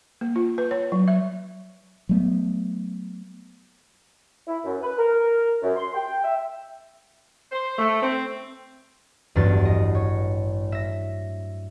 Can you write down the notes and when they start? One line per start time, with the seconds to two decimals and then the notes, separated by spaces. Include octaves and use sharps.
0.21 A#3
0.36 F4
0.58 B4
0.71 C#5
0.92 F#3
1.08 E5
2.09 F#3 A3 B3
4.47 E4
4.65 F#2
4.82 B4
4.98 A#4
5.63 F#2
5.76 C6
5.94 G5
6.24 E5
7.52 C5
7.79 A3
8.02 C4
9.35 A1 E2 G2 F#3 F#4 A6
9.65 D#5
9.95 C#5
10.72 E5 A#6